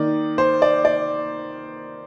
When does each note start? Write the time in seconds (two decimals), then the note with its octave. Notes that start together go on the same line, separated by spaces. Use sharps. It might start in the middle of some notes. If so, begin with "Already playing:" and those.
Already playing: D#3 A#3 D#4 D5
0.38 C5
0.62 D5
0.85 D5